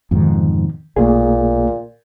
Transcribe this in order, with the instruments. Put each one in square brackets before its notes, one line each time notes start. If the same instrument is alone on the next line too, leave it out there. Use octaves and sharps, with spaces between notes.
[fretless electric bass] F2 G#2 B2 [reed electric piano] D#3 E3
[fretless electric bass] B1 [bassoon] A#2 [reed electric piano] A3 A#3 G#4